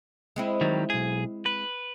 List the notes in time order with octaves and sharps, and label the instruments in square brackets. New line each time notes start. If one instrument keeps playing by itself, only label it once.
[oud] G#3 C4 E4
[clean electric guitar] D#3 F#3 G3
B1 G#4
B4